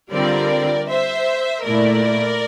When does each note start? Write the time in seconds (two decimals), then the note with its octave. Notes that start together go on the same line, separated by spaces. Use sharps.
0.12 D3 G3 C4 F4 A#4 D5
0.88 C5 E5
1.65 A#2 A3 E4 A#4 D5